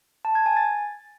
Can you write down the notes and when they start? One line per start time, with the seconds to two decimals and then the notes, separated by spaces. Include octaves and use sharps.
0.25 A5
0.35 G#6
0.46 G#5
0.57 A6